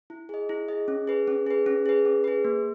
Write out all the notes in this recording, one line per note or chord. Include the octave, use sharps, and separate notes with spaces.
E4
G#4 D#5
E4
G#4 D#5
C#4
G#4 B4
C#4
G#4 B4
C#4
G#4 B4
C#4
G#4 B4
A#3